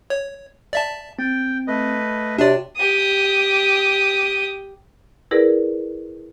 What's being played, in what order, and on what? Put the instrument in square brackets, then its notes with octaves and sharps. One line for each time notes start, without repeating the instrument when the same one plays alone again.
[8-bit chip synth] C#5
D5 E5 A5
[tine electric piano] C4 [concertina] G5
[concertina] A3 B4 D#5
[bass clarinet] C3 [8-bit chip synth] D4 D5 [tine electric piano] F#4 C#5
[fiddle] G4 D#6
[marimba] E4 G#4 A#4 B4 D5